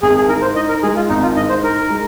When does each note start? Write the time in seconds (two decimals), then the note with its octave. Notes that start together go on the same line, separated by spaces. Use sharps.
0.02 G#1 G#4
0.16 G#4
0.29 G#2 A#4
0.42 C5
0.56 D#4 D#5
0.69 A#4
0.82 G#3 G#4
0.96 F4
1.09 G#1 D#4
1.22 F4
1.36 G#2 D#5
1.49 C5
1.63 D#4 A#4
1.90 G#3